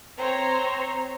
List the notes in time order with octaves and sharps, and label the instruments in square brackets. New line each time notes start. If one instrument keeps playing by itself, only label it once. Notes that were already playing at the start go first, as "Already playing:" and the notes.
[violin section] C4 C5 C#5 A#5